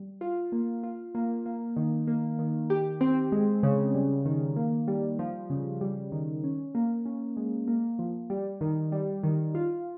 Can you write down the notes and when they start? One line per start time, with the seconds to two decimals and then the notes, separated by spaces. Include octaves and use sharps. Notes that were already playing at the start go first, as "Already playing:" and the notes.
Already playing: G3
0.21 F4
0.52 A#3
0.83 F4
1.15 A#3
1.46 A#3
1.76 D#3
2.07 A#3
2.39 D#3
2.70 G4
3.01 C4
3.32 G#3
3.63 C#3
3.94 G3
4.25 D#3
4.56 A#3
4.88 G3
5.19 F3
5.50 C#3
5.81 G3
6.12 D#3
6.44 C#4
6.75 A#3
7.06 C#4
7.37 G#3
7.68 A#3
7.99 F3
8.30 G3
8.61 D#3
8.92 G3
9.23 D#3
9.55 F4